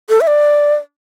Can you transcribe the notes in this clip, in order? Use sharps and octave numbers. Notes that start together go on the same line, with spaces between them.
A4
E5
D5